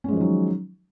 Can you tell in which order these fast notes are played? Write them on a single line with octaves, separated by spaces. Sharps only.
C#4 G#3 F3 D#3 F#3